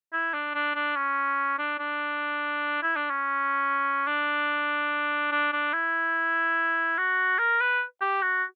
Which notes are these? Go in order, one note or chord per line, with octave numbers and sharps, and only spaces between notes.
E4
D4
D4
D4
C#4
D4
D4
E4
D4
C#4
D4
D4
D4
E4
F#4
A#4
B4
G4
F#4